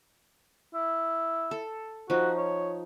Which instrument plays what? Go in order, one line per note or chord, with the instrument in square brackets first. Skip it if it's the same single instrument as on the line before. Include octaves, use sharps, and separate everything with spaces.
[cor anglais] E4
[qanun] A4
[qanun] F3 D#4 [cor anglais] F#4
[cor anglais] C#5